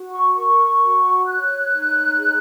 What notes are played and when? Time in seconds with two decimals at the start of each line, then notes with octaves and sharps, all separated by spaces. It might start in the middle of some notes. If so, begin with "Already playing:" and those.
Already playing: F#4
0.13 C#6
0.35 A#4 C#6
0.81 F#4
1.26 C#5 F#6
1.72 D#4
2.17 G#4